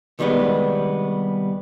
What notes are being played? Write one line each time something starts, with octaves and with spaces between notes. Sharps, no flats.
C2 D#3 G3 G#3 B3